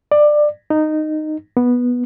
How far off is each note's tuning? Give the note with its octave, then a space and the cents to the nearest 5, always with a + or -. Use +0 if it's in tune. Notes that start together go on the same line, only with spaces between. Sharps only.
D5 +20
D#4 -15
B3 -10